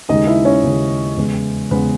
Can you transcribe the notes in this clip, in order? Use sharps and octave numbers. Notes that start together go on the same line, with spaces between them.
D#2 C#3 G#3 D#4 D#5
E4 E5
C#4 C#5
D#2 C#3 G#3
E2 C#3 G#3
E2 C#3 G#3 B3 B4